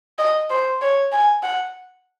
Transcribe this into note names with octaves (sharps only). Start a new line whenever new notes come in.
D#5
C5
C#5
G#5
F#5